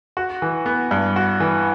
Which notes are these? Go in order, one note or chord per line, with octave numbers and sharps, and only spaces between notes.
F#4
E3
B3
G2
F#4
E3